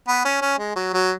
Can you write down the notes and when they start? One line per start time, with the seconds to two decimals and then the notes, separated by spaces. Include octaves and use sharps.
0.08 B3
0.25 C#4
0.42 C#4
0.59 G#3
0.76 F#3
0.94 F#3